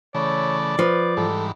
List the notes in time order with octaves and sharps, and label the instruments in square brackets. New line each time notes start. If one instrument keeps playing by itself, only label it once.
[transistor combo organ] C#3 E3 A3 [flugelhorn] C#5 [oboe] D5
[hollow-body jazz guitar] F3 [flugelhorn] B4
[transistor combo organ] G#2 E3 G3 [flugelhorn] A4